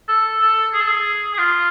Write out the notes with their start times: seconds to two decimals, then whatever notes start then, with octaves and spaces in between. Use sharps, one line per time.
0.08 A4
0.41 A4
0.73 G#4
0.80 A4
0.88 G#4
1.33 G#4
1.38 F4